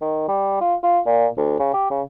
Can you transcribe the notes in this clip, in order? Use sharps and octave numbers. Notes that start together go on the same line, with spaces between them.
D#3
G3
F4
F4
A#2
D2
C#3
G4
C#3